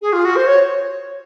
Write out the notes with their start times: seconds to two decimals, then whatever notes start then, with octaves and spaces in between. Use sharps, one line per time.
0.02 G#4
0.13 F4
0.25 F#4
0.36 C5
0.47 C#5